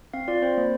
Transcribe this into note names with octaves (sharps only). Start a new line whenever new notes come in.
C4 F5
F4 D5
C4 C5
A#3